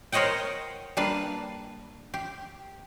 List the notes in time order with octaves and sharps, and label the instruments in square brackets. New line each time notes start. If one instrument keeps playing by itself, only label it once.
[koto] A#4 C5 C#5 D#5 F#5 G5
G3 A#3 D4 B4 F5
G4